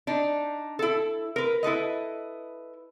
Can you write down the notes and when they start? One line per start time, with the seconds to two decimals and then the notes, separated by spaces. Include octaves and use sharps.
0.07 D4 D#4
0.79 E4 A4
1.36 A#4 B4
1.63 E4 A4 B4 D#5